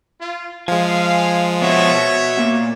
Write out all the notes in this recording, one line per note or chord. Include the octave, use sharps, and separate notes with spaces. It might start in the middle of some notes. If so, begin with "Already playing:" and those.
F4
F3 G#3 F5 G#5
B2 F#4 C#5 E5
A#2